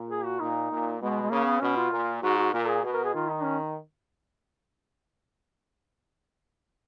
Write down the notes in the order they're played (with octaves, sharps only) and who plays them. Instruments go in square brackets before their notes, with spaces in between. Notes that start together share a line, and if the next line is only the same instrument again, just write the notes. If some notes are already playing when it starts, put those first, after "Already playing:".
Already playing: [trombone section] A#2
[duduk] G#4
F#4
[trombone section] A#2 [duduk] D#4
[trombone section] A#2
[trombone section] B2 [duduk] G#3
[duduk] G#3
[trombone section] C#3 [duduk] A#3
[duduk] B3
[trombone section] B2 [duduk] C#4
[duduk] F4
[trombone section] A#2
[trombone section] G#2 [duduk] F#4
[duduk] F#4
[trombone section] A#2 [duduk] A#4
[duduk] G#4
[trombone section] B2
[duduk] A#4
G#4
[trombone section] D#3 [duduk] F4
[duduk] D#4
C#4